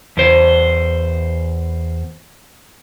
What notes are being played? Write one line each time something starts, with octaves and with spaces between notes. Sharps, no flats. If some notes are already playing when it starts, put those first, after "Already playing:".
E2 C5